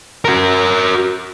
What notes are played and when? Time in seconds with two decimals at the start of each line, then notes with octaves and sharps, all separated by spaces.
0.25 F#4 A#4